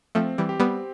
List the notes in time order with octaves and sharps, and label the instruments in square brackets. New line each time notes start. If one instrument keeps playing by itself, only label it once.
[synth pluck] F3 A3 [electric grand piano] C4
[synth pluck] E3 G3
[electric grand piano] G4
[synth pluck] G3 B3